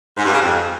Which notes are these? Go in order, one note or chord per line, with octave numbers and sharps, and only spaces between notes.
G#2
G2
C#3
F2